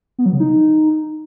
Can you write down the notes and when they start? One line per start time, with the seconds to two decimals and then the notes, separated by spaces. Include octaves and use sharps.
0.18 B3
0.26 F#3
0.33 C#3
0.40 D#4